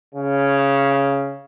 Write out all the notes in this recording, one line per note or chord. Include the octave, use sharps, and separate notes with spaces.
C#3